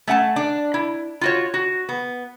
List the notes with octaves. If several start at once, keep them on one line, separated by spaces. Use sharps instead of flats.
A3 C#4 F#5 A5
D4
E4
F4 F#4 C#5
F#4
B3